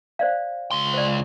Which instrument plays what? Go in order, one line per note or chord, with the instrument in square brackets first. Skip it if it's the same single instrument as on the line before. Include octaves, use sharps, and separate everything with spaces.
[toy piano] C5 D5 F5
[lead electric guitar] C#2 C6
[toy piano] C5 D5